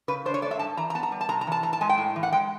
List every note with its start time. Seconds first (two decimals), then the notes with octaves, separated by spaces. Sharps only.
0.08 C#3 B4
0.25 D4 C5
0.34 C#5
0.42 A3 D5
0.51 E5
0.59 G2 A5
0.77 E3 A#5
0.90 A#5
0.95 B3 A5
1.03 A#5
1.12 G3
1.21 A5
1.29 C3 A#5
1.41 A#5
1.47 E3 A5
1.63 A2 A#5
1.73 A5
1.81 G#3 G#5
1.89 G5
1.98 A2
2.16 E3
2.23 F#5
2.32 G#3 G5